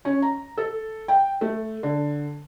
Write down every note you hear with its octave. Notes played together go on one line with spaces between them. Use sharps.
C#4
A#5
A4
G5
A3
D3